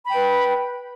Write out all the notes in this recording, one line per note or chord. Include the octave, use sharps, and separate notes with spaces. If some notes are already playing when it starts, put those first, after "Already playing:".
B4 G5 B5